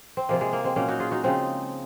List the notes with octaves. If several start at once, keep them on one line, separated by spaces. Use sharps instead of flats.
C4
C3 F3 G#3 A#3
G#3
A#3
G#3 C4
A#2 F#3 A#3 C#4
D#4 F#4
F4 G#4
D#4 F#4
C#3 F3 G#3 C4 D#4